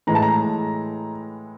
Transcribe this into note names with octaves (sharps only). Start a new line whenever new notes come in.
A2 E3 G#3 A#5
A5
A#5